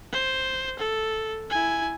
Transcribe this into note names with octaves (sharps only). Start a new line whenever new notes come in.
C5
A4
E4 G#5